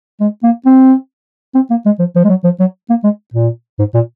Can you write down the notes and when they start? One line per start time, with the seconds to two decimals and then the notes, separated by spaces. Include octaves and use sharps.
0.20 G#3
0.44 A#3
0.66 C4
1.55 C4
1.70 A#3
1.86 G#3
1.99 F3
2.15 F3
2.24 G#3
2.30 F#3
2.44 F3
2.60 F#3
2.90 A#3
3.04 G#3
3.34 A#2
3.79 G#2
3.94 A#2